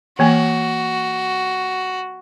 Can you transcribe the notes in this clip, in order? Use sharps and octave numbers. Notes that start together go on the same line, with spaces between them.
E3 A#3 F#4 G#5